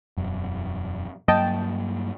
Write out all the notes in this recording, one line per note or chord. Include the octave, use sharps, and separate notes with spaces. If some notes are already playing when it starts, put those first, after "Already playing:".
E1 F#2
G2 F#3 A#3 D#5 G5 A5